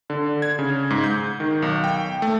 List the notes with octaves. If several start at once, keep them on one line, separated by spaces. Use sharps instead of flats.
D3
G#6
C#3
G#2
G6
D#3
B1
G5
A3